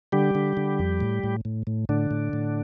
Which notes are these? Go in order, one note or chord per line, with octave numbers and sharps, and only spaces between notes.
D3 G3 G4
D3
D3
F2
A2
A2
A2
A2
A2 D3 D4
A2
A2